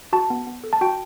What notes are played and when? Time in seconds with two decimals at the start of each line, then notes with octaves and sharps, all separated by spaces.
0.13 F#4 A5
0.30 B3
0.47 B3
0.64 A4
0.73 A5
0.81 F#4 G5